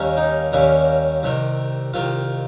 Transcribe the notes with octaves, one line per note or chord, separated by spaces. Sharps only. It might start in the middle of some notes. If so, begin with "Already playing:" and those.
Already playing: D#2 D#3 G3 A#3 C#4
D#4
D#2 D#3 G3 A#3 C#4
C2 C3 D#3
C2 C3 D#3 F4